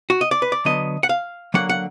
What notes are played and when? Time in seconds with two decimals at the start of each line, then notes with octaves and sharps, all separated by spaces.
0.10 F#4
0.21 D#5
0.31 D5
0.42 B4
0.52 D5
0.65 D3 F#3 B3 D#5
1.03 F#5
1.09 F5
1.54 D3 F#3 A#3 F#5
1.69 F#5